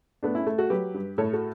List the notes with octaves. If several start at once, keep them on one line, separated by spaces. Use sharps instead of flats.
A3 B3 D4
C#4 E4
A3
F#4 A4
F#3 G4 B4
G2
A2 A4 C#5
F#4 A4